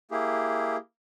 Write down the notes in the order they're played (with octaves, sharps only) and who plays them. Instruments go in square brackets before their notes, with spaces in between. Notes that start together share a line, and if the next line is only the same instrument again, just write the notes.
[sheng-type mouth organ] A#3 E4 G4 G#4